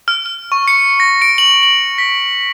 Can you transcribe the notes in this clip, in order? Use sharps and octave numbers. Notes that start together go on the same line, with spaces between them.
F6
F6
C#6
C#7
A#6
D7
F#7
F#7
B6